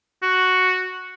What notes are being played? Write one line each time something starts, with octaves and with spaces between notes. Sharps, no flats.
F#4